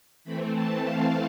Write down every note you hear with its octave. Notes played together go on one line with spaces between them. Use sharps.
E3 A3 C4 B5
A5
F5